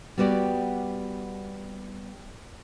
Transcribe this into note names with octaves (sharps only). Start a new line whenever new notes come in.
G3 B3 F#4 G4 D5